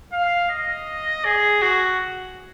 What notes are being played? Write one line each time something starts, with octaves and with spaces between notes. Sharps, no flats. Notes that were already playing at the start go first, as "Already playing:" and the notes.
F5
D#5
G#4
F#4